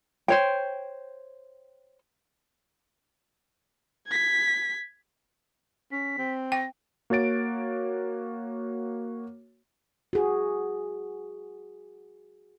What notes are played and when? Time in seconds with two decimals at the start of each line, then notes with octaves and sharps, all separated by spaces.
0.28 C5 C#5 G5
4.08 G#6 B6
5.92 C#4 B6
6.18 C4
6.52 G5 A#6
7.10 A#3 F#4 C#5 A6 D7
10.13 F#4 G#4